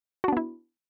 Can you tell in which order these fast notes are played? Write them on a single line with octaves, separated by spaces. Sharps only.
F#4 D4 B3 E4